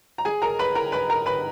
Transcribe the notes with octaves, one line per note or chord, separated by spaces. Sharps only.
A#5
G#4 G#5
A#4 A#5
B4 B5
A#4 A#5
B4 B5
A#4 A#5
B4 B5